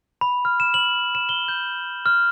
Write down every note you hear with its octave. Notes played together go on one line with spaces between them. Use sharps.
B5
F6
E7
F#7
E7
G7
G6
F6